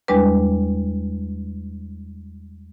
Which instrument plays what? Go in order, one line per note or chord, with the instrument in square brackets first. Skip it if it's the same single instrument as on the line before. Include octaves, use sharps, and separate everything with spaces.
[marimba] E2 G3 G#3 D4 B4